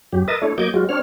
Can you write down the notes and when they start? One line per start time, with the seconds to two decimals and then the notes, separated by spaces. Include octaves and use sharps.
0.12 F#2 F#3 G4
0.28 A#4 B4 D#5 E5 D#6 A6
0.42 A3 D4 E4 C#5
0.58 F#3 A#3 D#5 D6 G6 G#6
0.74 F#3 G#3 F4 F#4
0.89 C4 D4 C#5 F6